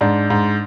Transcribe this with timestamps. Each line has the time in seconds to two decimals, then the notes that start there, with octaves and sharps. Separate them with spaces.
0.01 G#2 D4
0.30 G#2